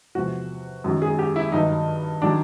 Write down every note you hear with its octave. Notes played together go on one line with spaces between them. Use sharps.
E2 C3 F3 F#4
F#2 D#3 F#3
G#4
G4
E4
G2 D#3 F#3 D#4
D#3 F#3 D4